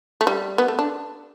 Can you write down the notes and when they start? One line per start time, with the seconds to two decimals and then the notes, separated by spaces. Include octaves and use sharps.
0.21 A3
0.27 G3
0.58 B3
0.68 A3
0.79 D4